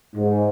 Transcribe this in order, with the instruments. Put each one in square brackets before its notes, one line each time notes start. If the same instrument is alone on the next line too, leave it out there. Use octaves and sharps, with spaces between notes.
[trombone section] G#2